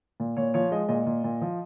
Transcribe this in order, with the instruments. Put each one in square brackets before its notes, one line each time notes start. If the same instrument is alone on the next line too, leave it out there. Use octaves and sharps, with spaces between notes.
[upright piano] A#2
A#2 C#5
F3 C#5
G#3 D#5
A#2 D#5
A#2
A#2
F3